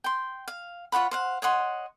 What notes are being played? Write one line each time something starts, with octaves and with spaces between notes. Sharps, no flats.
G5 C6
F5
F4 C#5 F#5 B5
C5 F5 F#5
C#5 D#5 F#5 C6